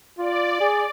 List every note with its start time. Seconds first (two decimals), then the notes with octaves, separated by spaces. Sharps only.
0.18 F4 D5
0.61 G#4